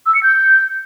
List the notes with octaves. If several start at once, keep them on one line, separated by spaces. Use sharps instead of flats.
E6
C#7
G6